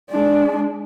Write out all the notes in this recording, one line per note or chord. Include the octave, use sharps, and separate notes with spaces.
G#3 D4